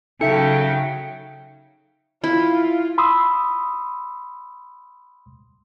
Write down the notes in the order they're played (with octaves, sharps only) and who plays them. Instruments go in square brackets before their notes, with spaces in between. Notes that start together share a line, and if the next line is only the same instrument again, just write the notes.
[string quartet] C#3 F#3 [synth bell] D#4 E5 B6 [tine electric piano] A4 C#7 [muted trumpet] G5
[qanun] E4 [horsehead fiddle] F4
[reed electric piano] B5 C6 D#6 E6